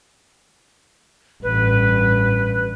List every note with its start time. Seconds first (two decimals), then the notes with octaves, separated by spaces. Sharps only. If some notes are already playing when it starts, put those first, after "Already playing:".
1.43 A1 G2 B4